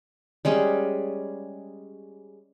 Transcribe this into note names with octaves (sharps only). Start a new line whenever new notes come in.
G3 G#3 C#4